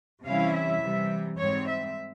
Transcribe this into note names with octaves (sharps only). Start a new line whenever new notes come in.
C3 E3 G3 C#4 E4 F5
E5
C3 E3 G3
G#2 G3 C4 C#5
E5